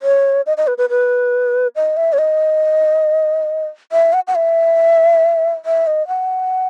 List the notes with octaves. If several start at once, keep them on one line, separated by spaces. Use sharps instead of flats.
C#5
D#5
D#5
B4
B4
B4
D#5
E5
C#5
D#5
E5
F#5
F#5
E5
E5
D#5
F#5